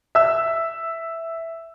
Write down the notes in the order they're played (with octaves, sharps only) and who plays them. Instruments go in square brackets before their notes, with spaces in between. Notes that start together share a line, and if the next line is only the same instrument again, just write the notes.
[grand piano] E5 E6